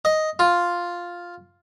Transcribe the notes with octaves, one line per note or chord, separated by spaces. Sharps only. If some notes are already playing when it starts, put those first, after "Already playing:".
D#5
F4